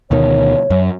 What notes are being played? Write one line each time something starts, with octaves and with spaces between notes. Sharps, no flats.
D2 B2 D#3 C#5
F#2